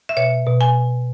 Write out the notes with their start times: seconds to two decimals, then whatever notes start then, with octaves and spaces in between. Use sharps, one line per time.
0.09 E5
0.17 B2 C#5
0.46 B2
0.61 G#5